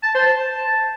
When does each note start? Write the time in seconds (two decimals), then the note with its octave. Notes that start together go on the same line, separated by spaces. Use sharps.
0.03 A5
0.14 C5
0.26 A5